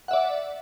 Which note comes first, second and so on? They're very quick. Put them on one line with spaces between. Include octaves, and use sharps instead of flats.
F#5 E5 D5